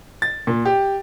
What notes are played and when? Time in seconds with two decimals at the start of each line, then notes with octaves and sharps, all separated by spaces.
0.22 A6
0.47 A#2
0.65 G4